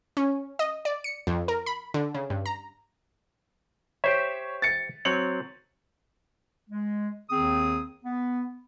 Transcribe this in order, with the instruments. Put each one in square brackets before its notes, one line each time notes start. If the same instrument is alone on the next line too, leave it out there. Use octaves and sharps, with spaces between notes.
[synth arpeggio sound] C#4
D#5
D5
C#7
F2
A#4
B5
D3
C#3
G2
A#5
[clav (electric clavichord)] G4 C5 E5 [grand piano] C#5
[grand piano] A6 C#7
[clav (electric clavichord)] F#3 C4 C#5 [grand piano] F#7
[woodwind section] G#3
D#2 D#3 C4 G#4 D#6
B3